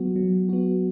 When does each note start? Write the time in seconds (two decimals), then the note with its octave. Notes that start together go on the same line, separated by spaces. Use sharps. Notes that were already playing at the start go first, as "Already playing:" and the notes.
Already playing: F#3 B3 F#4
0.16 F#3
0.49 B3 F#4